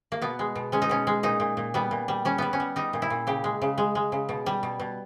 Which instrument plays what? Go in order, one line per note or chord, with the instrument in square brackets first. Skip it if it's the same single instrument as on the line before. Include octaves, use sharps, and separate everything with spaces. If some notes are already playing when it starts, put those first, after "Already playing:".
[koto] A#3
B2 B3
G#3
B2
G#3 C#4
D#4
B2 C#4
G#3
A#2 D#4
A#2
A#2
G3 B3
A#2
G3
G3 C#4
G3 B3
C#4
G3
G3 D#4
A#2
E4
A#2
C#3 G4
G#3
C#3
G#3
G#3
C#3
B2
G3
B2
B2